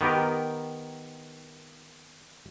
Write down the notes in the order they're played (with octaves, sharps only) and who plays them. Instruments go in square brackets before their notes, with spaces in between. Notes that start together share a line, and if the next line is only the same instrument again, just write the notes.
[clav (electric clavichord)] D#3 B3 G4 A#4